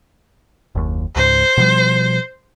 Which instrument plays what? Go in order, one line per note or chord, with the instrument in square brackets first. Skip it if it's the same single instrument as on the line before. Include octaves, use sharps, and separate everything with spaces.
[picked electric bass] F#1 D#2
[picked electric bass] C#2 G#2 [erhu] C5
[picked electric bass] B2 F3 G3